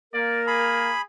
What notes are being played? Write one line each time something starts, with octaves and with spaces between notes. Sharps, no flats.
A#3 A#4 D5
G#4 B5